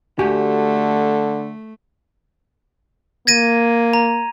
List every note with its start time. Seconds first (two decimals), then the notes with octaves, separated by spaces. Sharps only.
0.19 D3 A3 F#4 G4 G#5
3.27 A#3 G#6 A#6 D#7
3.93 A#5